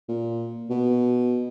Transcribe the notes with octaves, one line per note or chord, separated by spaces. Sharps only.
A#2
B2